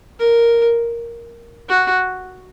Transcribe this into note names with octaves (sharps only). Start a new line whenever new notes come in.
A#4
F#4